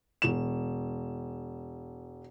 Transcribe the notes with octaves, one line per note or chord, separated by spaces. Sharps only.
E1 E7